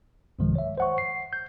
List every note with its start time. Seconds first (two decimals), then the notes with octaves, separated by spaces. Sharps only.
0.39 B1 G2 C3 D#3 F3 G#3
0.55 C#5 E5
0.78 C5 F#5 C#6
0.98 C7
1.33 G6